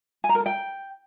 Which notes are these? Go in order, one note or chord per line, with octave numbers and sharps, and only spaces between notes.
G#5
A#5
A#4
A4
G5